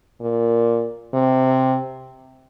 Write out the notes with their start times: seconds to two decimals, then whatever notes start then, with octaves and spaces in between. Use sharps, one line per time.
0.21 A#2
1.14 C3